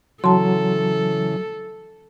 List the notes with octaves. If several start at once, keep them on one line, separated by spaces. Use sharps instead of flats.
C#3 E3 F#3 A4 A5 C6